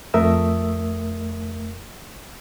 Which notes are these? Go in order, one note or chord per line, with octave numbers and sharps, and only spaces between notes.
F2 A3 A#4 E5 D#6 E6